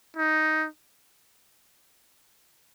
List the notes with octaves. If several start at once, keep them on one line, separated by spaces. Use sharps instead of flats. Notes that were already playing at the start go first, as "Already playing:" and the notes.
D#4